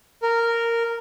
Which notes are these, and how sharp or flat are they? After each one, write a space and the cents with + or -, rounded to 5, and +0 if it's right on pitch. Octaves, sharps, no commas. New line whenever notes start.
A#4 -10